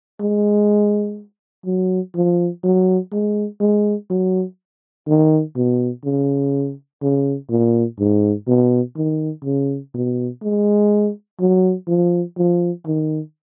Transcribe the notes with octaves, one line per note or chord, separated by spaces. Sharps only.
G#3
F#3
F3
F#3
G#3
G#3
F#3
D#3
B2
C#3
C#3
A#2
G#2
B2
D#3
C#3
B2
G#3
F#3
F3
F3
D#3